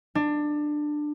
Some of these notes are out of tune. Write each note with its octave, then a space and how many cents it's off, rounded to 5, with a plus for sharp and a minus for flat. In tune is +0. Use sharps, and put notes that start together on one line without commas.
D4 +20